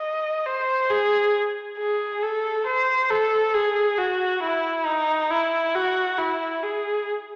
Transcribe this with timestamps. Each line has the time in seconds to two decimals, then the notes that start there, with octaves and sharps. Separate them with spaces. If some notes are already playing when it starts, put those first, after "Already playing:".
Already playing: D#5
0.46 C5
0.90 G#4
1.79 G#4
2.23 A4
2.66 C5
3.11 A4
3.55 G#4
3.98 F#4
4.43 E4
4.86 D#4
5.30 E4
5.75 F#4
6.18 E4
6.63 G#4